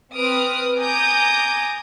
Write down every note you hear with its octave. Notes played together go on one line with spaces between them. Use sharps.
C4 B4 D#6 F6 D7
G#5 A#5 D6 D#6 G6